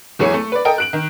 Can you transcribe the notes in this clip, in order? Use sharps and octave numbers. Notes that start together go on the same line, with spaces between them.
F#1 E2 E3 G#4 C#5 C#7
A3
B4 D5
A4 A#4 D#5 G5
F#6 D7 F#7
D#3